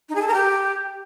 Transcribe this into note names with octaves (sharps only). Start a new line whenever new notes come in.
D#4
G#4
A4
A#4
G4